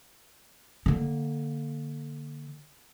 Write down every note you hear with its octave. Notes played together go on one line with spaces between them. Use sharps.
D3 A#3